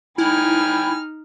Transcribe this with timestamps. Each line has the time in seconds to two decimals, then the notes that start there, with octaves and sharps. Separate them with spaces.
0.18 D#4 E4 G5 G#5 B5 F6